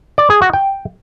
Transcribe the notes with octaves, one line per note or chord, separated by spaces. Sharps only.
D5
G#4
F#4
G5